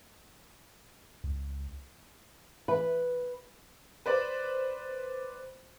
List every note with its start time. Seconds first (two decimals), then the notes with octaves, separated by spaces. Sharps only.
1.24 C#2
2.68 E3 B4
4.06 B4 C5 D5